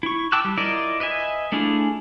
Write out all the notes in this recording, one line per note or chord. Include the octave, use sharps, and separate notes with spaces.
E4 C#6
G5 A5 D6 E6 F#6
G3
E4 F4 A#4 D5 D#5
B4 D#5 E5 G#5
A3 D4 E4 F4 G#4